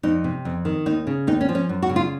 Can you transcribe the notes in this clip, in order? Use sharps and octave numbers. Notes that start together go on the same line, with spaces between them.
F2 D#4
C3
F2
D#3
D#2 D#4
C#3
D#2 D#4
C#4
F3
C#4
F#2
F#4
C#3
F4